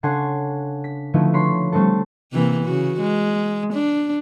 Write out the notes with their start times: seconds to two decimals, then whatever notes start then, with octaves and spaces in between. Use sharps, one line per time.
0.03 C#3 D4 A4 F#5 G#5 C6
0.84 B6
1.14 D3 F3 A3 D#4 E4 B4
1.33 D4 C#5 B5 C6
1.72 G3 A3 C4 D4 A4
2.33 C3 E3 A#3
2.64 C#3 F#4
3.00 G#3
3.73 D4